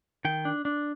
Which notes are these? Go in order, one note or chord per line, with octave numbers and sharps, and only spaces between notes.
D#3 G5
D4
D4